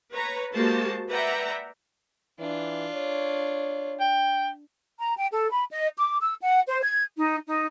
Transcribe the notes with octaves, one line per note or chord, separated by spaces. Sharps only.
B4 C#5 A#5
G#3 A#3 F#4 G4 C5 A5
B4 D5 E5 F#5 G5 A#5
E3 D4 F4
C#5
G5
A#5
G5
A4
B5
D#5
D6
E6
F#5
C5
G#6
D#4
D#4